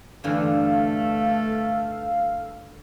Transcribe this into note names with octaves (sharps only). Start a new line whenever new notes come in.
G2 D3 E3 A3 A4 F5